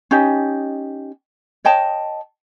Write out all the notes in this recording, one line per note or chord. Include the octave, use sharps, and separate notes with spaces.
C#4 D#4 G4 D#5
C#5 D#5 G5 A5